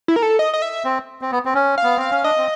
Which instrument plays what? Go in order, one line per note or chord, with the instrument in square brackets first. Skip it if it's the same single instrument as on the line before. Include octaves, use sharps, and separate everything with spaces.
[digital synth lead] E4
A#4
A4
D#5
D#5
E5
[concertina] C4
C4
B3
C4
C#4
[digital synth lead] F5
[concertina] B3
[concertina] C4 [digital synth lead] F5
[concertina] C#4
[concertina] D4 [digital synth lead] D#5
[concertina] C4